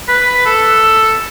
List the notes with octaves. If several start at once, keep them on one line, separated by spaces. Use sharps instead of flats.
B4
A4